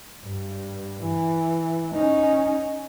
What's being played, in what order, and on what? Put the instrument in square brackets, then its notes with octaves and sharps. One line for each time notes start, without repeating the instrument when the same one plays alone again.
[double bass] G2
E3
C#4 D#4